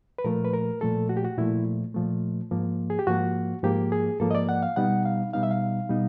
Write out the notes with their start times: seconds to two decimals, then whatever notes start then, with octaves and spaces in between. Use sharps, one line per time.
0.18 B4
0.24 A#2 F3 A3 A#4
0.45 B4
0.54 A#4
0.81 A#2 F3 A3 A4
1.09 F#4
1.17 G4
1.25 F#4
1.37 A#2 F3 A3 E4
1.94 A#2 F3 A3
2.51 G#2 F3 A#3
2.90 G#4
2.99 G4
3.07 G#2 F3 A#3 F#4
3.63 G#2 F3 A#3 G4
3.92 G#4
4.20 G#2 F3 A#3 A4
4.31 D#5
4.35 D5
4.49 F#5
4.63 F5
4.76 B2 G3 B3 D#4 F#5
5.05 F5
5.33 B2 G3 B3 D#4 F5
5.43 E5
5.51 F5
5.89 B2 G3 B3 D#4